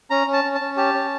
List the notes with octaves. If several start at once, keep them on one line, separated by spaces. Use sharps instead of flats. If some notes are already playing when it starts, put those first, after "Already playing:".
C#4 A#5
C#4
A5
C#4
A5
C#4
G4 A5
C#4